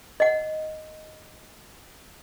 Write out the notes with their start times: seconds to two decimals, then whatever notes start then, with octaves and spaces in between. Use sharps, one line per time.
0.20 D#5 F#5